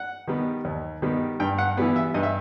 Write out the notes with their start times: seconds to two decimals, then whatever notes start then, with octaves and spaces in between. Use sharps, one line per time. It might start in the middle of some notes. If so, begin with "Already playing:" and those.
Already playing: F#5
0.28 D#3 G3 B3
0.65 D#2
1.02 D#3 G3 B3
1.40 G2 G5
1.59 F#5
1.77 E3 G3 B3
1.96 E5
2.14 G2 D#5
2.23 E5